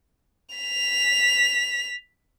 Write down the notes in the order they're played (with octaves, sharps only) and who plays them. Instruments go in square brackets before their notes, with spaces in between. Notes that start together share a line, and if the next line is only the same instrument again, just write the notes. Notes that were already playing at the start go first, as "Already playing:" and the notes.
[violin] B6 F7